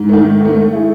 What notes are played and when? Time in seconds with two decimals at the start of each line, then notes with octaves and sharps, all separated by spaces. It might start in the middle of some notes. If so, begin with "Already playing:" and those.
Already playing: G#2
0.09 D#3 A3
0.25 G#2
0.41 D#3 A3
0.56 A3
0.72 E4 G#4